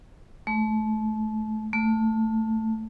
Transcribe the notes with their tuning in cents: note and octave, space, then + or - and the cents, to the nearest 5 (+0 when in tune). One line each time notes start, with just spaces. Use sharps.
A3 -25
A3 +10